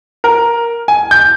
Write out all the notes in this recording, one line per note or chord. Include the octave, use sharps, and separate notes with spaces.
A#4
G#5
G6